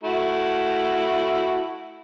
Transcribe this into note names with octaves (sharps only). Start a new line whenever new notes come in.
A3 E4 F#4